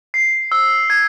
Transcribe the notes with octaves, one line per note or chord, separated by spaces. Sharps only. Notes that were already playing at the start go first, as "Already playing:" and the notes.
C7
E6
G#6